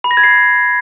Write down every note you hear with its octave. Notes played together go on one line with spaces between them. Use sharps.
B5
A#6
G#6
C7